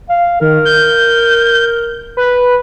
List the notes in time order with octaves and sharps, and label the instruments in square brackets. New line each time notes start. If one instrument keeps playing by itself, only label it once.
[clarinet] F5
[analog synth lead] D#3 [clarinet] A#4
[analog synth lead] G6
B4